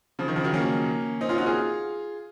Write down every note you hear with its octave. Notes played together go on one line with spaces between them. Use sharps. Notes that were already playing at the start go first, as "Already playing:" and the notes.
C#3 F3
D#3
C#3 F3
D#3 F#3
A#3 C#4
C4 D#4
C#4 F4
D#4 F#4
F4 G#4